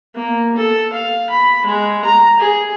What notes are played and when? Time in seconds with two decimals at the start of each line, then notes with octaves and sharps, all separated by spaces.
0.15 A#3
0.56 A4
0.93 F5
1.30 B5
1.65 G#3
2.05 A#5
2.39 G#4